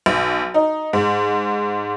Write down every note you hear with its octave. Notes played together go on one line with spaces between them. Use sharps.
B1
D#4
G#2